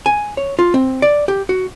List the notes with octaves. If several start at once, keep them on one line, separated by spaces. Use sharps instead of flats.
G#5
C#5
F4
C4
D5
G4
F#4